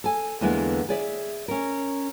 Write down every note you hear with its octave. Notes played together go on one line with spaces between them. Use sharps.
A4 G#5
E2 D3 E3 G#3 A#3 B3
G#4 D5 E5
C#4 A#4